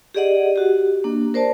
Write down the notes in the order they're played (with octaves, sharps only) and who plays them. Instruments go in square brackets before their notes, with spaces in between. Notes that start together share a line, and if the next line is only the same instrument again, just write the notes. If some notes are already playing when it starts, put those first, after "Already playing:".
[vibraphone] G4 G#4 D5 D#5 F#5
F#4 G4
A#3 D4
A#4 C5 D5 A5